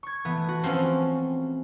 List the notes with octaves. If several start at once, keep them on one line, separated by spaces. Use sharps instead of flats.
C#6 G#6
E3 A3 B3
F#4
F3 C4 C#4